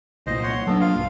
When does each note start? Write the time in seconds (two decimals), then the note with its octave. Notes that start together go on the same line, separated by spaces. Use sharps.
0.27 C2 A#2 C5 D#5
0.43 C#5 F#5 C6
0.67 F#3 A#3 B3 D4 A4
0.81 F4 F5
0.95 B1 G2